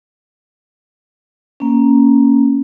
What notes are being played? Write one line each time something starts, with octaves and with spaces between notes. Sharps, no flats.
A#3 C#4